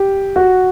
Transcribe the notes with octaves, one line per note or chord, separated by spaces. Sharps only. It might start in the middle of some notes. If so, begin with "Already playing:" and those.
Already playing: G4
F#4